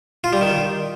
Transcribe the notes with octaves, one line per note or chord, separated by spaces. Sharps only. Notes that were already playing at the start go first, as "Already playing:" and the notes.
F4
G3
D#3